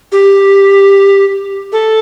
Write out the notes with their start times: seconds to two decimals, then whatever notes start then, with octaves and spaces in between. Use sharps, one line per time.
0.12 G4
1.72 A4